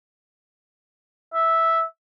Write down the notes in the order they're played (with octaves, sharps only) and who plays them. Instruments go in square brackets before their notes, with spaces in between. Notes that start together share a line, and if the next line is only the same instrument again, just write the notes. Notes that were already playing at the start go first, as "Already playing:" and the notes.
[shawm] E5